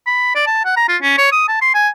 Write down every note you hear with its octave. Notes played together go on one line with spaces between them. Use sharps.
B5
D5
A5
F#5
A#5
F4
C#4
C#5
D#6
A5
C6
G#5